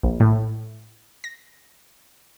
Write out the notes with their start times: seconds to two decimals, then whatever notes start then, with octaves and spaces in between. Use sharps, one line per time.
0.03 A#1
0.20 A2
1.24 A#6